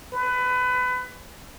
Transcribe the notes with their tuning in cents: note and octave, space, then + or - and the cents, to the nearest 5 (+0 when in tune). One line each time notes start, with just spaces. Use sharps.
B4 +25